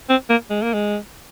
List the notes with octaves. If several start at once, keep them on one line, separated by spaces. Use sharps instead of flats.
C4
A#3
G#3
A#3
G#3